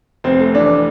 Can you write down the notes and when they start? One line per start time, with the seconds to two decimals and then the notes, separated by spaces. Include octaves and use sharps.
0.24 F1 C4
0.39 A3
0.54 E3 D4